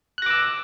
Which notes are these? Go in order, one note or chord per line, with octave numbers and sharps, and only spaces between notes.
D6 E6 F#6 A#6